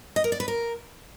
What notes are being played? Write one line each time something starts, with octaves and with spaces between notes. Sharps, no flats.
D#5
A#4
D5
B4
A#4